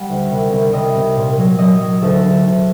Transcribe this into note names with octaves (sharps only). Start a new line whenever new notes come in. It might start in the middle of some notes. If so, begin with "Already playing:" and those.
Already playing: G3 F#5
D2
C2
C2
C2 D#5
C3
A#2
F#3
F#3 D#5
F#3
D2 A4
D2
D2